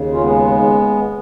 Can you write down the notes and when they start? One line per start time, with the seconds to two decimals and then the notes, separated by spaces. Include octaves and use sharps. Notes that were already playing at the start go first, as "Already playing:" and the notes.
Already playing: D#2 C#3
0.11 C#4 F4
0.21 G#3 B3